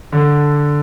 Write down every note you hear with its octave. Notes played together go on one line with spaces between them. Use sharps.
D3